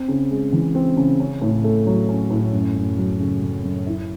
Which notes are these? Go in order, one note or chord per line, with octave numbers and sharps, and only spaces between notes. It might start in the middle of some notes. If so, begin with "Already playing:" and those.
Already playing: C4
C#3
G#3
E3
C4
C#3
C#4
A2
A3
F#3
C#4
A2
F#2
F#2
F#3
C#3
F#2
F#2
E4